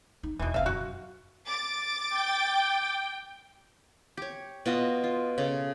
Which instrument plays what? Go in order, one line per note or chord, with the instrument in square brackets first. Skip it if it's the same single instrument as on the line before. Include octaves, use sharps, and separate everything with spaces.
[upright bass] D#4
[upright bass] E1 [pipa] B2 E3
[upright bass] C#3 C4 [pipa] E5 F5
[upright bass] F#2 [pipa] F#4
[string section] D6 A6
[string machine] G5
[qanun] G4 C#5
B2 F4 F#4 D#5
F4
C#3 A4